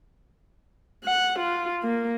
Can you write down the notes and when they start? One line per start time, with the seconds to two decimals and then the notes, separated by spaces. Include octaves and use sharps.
1.04 F#5
1.39 F4
1.84 A#3